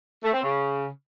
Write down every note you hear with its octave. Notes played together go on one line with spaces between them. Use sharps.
A3
C4
C#3